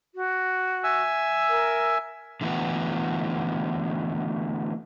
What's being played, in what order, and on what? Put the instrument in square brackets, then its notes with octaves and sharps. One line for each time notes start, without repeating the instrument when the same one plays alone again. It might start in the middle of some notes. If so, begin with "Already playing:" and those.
[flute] F#4
[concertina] E5 G#5 E6
[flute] A#4
[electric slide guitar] D3 E3 A3 B3 F#4